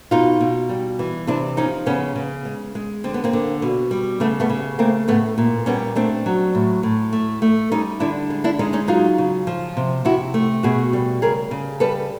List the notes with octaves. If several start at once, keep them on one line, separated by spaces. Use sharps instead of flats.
B2 D#4 F4
B2
G3
E3
C3 D4 E4
F3 C#4 D#4
C#3 B3 C#4
C#3
G#3
G#3
D3 C4
B3
A#3 C4
D3
B2
G3
C#3 A3 B3
A3 B3
C#3
A3 A#3 C4
A2 A3 B3
A#2
G3 B3 C#4
A3 C4 D4
F#3
A2
A2
A3
A3
G3 C#4 D#4
D3 D4 E4
G#3
D4 E4
G#3 C#4 D#4
C#4 D#4
F#3 D#4 F4
C#3
F3
C3
C3 E4 F#4
A3
B2 F#4 G#4
G3
C#3 G#4 A#4
C#3
G3 A4 B4